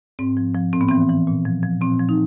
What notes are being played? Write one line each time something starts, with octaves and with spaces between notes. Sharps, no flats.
G#2 C4
F3
F3
A2 C4
B3
E3 C4
E3
A#2
F3
F3
A#2 C4
F3
D#4